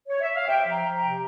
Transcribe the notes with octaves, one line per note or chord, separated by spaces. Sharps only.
C#5
E5
F5
C3 E5 G5
F3
G5 A#5
F3
G5 A#5
C3